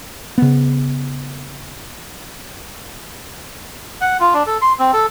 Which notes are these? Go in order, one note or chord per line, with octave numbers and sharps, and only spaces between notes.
C#3 B3
F#5
F4
D4
A4
C6
C4
A4